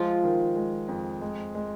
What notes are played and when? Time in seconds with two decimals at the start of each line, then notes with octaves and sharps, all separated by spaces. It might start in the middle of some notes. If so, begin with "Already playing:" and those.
Already playing: F3 G#3 F4
0.24 D#3
0.56 G#3
0.88 F2
1.21 G#3
1.55 G#3